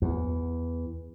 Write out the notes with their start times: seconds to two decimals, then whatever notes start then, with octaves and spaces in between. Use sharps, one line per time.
0.02 E2